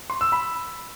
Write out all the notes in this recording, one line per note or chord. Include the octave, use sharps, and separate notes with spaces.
C6
E6
B5